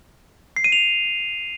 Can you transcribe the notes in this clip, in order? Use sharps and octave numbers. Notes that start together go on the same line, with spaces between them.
C7
D#7
F7